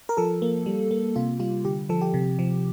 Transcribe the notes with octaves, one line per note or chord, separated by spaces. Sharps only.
A#4
F3 A4
A#3
G3
A#3
C3 F4
G3 F4
D3 G4
F3 A4
G4
C3
F3